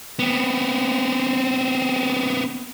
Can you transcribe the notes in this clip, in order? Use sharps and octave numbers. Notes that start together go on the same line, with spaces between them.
B3 C4